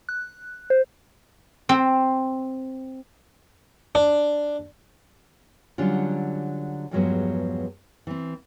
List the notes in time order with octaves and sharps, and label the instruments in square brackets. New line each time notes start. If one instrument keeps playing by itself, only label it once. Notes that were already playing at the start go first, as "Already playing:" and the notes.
[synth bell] F#6
C5
[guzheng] C4
[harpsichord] D4
[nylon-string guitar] D3 F#3 G3 C#4 D4 F4
E2 G2 F3 F#3 G#3 B3
E3 C4